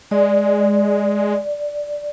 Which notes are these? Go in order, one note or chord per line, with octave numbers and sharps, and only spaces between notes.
G#3 D5